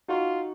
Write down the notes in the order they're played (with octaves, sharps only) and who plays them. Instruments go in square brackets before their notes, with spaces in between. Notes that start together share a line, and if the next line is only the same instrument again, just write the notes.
[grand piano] D#4 F#4 [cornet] F4